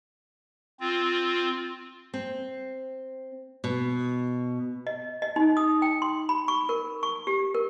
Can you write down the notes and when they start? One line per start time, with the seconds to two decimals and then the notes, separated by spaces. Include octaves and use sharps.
0.80 C4 F4
2.14 C4
3.64 B2
4.87 D#5
5.22 D#5
5.36 D#4
5.57 D#6
5.82 G5
6.02 C6
6.29 B5
6.48 C#6
6.69 A#4
7.03 C#6
7.27 G4
7.55 A#4